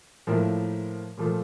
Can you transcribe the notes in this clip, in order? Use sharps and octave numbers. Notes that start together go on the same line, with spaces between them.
A2 F3 A#3 E4 A#4
A#2 F3 A3